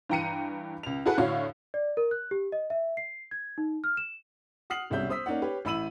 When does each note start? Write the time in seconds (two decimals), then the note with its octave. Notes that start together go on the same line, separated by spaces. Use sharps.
0.09 G2 E3 G5 A#5 C#7 D#7
0.83 C#2 F7
1.06 E4 F#4 G#4 A4 B4 F#5
1.18 A2 D3 F#4 C#5 F5
1.74 D5
1.97 A#4
2.11 F#6
2.31 G4
2.52 D#5
2.70 E5
2.97 C7
3.31 G#6
3.58 D#4
3.84 F6
3.97 E7
4.70 F#5 D#6 F6 C7 F#7
4.90 E1 C2 G3 C#4 E5 G6
5.09 C5 D#6 E6 B6
5.26 A#3 C#4 D#4 D5 F#5
5.42 G4 B4 C#5
5.65 A1 E4 B5 E6 D#7 F#7